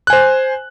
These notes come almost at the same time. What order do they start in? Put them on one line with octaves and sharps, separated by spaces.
F#6 G#5 C5